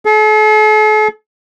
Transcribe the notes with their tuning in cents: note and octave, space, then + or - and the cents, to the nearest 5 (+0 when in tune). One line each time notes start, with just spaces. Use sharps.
A4 -45